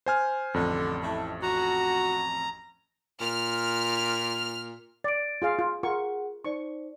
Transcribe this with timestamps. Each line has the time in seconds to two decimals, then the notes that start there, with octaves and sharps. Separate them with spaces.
0.06 C5 G#5 F6
0.54 A1 F2 D3
1.03 A3 E4
1.43 F#4 A#5
3.21 A#2 F6
5.04 D5 A6 D7
5.42 F4 G#4 F5
5.59 F4
5.83 F4 G#4 A#4 F#5 C#6
6.45 D#4 C5 D5 C#6